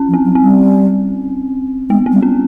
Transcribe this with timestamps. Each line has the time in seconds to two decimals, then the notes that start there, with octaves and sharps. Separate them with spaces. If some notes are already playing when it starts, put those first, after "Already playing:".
Already playing: C#4
0.08 F3
0.14 C4
0.25 F#3
0.35 C4
0.41 G3
1.89 G#3 B3
2.06 C4
2.12 G3
2.22 C#4